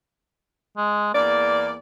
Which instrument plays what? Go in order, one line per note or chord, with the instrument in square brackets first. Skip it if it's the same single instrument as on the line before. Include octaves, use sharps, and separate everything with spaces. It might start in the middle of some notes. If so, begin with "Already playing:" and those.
[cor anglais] G#3
[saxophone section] E2 D5 [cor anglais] A#3